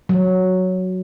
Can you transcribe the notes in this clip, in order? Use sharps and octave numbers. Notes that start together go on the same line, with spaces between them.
F#3